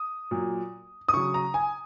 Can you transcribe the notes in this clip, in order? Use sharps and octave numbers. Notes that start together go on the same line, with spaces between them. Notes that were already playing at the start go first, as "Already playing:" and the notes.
Already playing: D#6
A#2 F#3
D#6
C#3 F#3 C#6
A#5
G#5